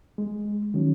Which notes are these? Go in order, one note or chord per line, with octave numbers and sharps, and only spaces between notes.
G#3
D#3 F#3 C#4